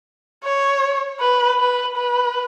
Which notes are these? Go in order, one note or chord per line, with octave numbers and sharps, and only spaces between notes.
C#5
B4
B4
B4